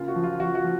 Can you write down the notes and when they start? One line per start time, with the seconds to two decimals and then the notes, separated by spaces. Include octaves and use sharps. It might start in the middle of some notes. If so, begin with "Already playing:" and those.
Already playing: C#3 A#3 F4
0.08 F#4
0.16 F3
0.24 F4
0.39 F3 F#4
0.55 F#4
0.64 F3